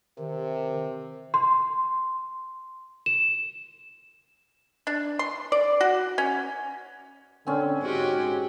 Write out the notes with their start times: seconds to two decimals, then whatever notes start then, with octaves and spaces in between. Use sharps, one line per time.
0.18 C3 D#3
1.34 C6
3.06 E7
4.87 D4
5.19 C6
5.52 D5
5.81 F#4
6.18 C#4
7.47 D3 C4 C#4
7.81 G#2 G#3 F#4 G4